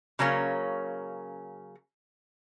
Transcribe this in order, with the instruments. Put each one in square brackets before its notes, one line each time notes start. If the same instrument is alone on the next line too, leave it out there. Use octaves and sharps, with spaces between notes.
[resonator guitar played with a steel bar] C#3 F#3 A#3 C#4